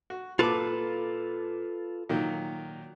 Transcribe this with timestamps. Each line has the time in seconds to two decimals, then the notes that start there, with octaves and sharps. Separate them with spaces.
0.10 F#4
0.39 A#2 F4 A4 B4 A5 D6
2.09 A#2 D#3 F#3